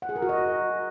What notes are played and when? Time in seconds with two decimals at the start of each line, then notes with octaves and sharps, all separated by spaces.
0.02 F#5
0.09 G#4
0.16 A#4
0.22 F#4
0.29 D#5